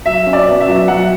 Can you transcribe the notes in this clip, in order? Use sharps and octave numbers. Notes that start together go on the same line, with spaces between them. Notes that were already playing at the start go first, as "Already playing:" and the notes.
F#3 E5
C#4
D5
B2
E5
F#3
F#3 F#5